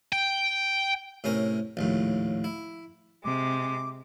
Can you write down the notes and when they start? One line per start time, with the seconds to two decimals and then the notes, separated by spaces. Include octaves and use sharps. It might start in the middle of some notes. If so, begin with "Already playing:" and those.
0.12 G5
1.24 A2 C3 C#4 A#4
1.77 A#1 D#2 A2
2.44 E4
3.24 C3 G#3 D6